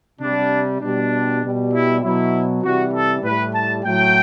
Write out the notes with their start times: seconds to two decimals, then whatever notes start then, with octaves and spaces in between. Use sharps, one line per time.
0.21 C3 G3 D4
0.81 B2 G3 D4
1.42 B2 G3
1.73 E4
2.03 B2 F#3 E4
2.63 C3 E3 G3 F#4
2.94 A4
3.24 A2 B4
3.29 G3
3.54 A5
3.85 A2 F#3 G5